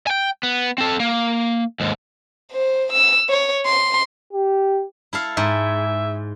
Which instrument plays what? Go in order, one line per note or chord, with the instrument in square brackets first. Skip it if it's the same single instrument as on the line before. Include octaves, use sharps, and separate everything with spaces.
[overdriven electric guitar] G5 G#5
B3
C4 A4
A#3
D#2 G#2
[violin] C5
E6
C#5
C6
[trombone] G4
[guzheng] E4 A4 F5
[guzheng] G#2 [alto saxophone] E5